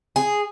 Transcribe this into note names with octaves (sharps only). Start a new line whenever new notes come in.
G#4